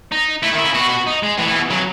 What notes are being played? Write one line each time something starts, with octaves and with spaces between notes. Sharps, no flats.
D#4
A3 E4
D#3
E4
C#3
B2 F#4
F#4
D#4
G#3
A2 E3
A2
B2
C#3 F#3